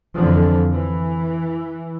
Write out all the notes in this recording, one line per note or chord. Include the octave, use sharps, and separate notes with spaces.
F2 D3 E3 F3
E3